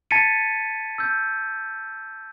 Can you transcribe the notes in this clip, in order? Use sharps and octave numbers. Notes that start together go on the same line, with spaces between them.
A5 G#6 A6 B6 C#7 D#7
E6 G6